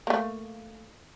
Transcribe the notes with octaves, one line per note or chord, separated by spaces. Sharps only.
A3 A#3